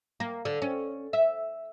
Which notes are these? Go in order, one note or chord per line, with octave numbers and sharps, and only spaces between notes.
A#3
D3
C#4
E5